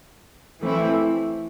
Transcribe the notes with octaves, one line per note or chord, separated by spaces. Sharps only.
E3 A3 C4 E4